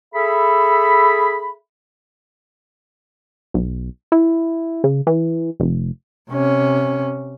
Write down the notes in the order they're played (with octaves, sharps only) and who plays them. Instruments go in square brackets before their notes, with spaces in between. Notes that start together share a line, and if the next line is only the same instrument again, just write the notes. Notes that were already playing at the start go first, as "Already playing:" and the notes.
[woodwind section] G#4 A4 E5 B5
[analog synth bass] B1
E4
C#3
E3
F1
[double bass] C3 C#4